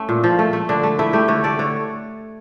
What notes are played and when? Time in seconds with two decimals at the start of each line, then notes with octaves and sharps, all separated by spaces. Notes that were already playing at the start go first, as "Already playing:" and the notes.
Already playing: A3 C#4
0.09 A#2
0.24 F3
0.39 A3
0.53 A3
0.69 D3 D4
0.83 A3
0.99 A3 E4
1.13 A3 G4
1.28 D3 C#5
1.44 A3 D5
1.59 D3 C#5